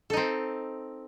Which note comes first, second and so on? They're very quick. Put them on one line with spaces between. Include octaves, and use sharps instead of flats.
A4 D#4 C4